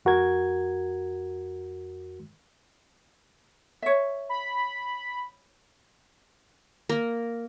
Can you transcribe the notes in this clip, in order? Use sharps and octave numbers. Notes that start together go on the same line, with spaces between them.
F2 F#4 A#4 G#6
C#5 E5
B5
A#3